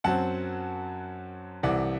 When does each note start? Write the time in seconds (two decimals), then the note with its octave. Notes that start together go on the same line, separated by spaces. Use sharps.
0.04 F#2 F#3 C4 F#5 A5
1.63 C2 C3 E3 D5 F#5